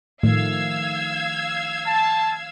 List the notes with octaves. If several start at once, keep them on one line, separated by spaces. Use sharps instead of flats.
A2 D#3 F3 A3 F5 E6 G#6
A5